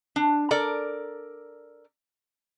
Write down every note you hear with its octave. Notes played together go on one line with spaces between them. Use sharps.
D4
A4 A#4 D5